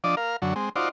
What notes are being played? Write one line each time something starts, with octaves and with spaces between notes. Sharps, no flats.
F3 D4 D5 D#5
A#4 F5
F#2 D3 F#3
G#3 C4
D#4 F4 F#4 C5 D5